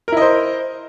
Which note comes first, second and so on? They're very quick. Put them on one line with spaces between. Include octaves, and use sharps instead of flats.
A#4 E4 D#5 C5